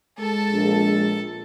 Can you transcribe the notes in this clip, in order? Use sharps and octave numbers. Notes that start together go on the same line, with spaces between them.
G#3 A4 A5
A#1